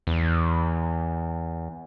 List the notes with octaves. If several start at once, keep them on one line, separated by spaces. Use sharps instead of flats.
E2